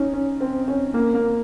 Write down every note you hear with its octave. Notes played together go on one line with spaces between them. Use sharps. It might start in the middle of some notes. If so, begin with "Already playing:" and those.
Already playing: C#4 D#4
C#4
C4
C#4
A#3
A#3